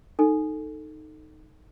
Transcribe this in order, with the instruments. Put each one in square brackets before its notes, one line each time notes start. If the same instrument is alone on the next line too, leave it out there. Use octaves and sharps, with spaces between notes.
[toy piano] D#4 A4